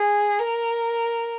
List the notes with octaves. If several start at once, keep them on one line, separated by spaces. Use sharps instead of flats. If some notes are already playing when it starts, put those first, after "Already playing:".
Already playing: G#4
A#4